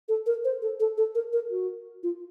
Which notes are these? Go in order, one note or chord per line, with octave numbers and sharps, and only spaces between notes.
A4
A#4
C5
A4
A4
A4
A#4
A#4
F#4
F4